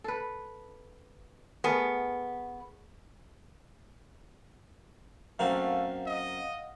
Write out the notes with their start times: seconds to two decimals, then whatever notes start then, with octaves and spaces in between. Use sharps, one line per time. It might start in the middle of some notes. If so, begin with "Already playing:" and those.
0.04 A4 B4
1.64 A3 B3 G#4 A#4
5.39 F#2 A3 A#3 C4 F5 F#5
6.07 D#5